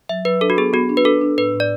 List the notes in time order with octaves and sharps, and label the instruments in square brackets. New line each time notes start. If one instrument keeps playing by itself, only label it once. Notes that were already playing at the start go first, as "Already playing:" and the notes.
[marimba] F#3 [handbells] E5
[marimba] F#3 [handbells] B4
[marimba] D4 [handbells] A4
[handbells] F#4
[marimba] B3 [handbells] G#4
[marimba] B3 [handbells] F#4
[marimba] D4
[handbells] B4
[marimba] D4 [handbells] A4
[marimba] D4
[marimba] A2 [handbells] B4
[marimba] A2
[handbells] D5